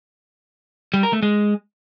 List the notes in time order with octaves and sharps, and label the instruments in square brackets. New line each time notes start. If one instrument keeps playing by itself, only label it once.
[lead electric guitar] G3
A#4
A3
G#3